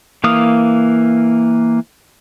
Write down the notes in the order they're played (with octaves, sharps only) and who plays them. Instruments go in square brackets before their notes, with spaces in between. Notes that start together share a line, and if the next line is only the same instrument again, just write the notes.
[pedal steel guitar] E3 A#3 F5 D#6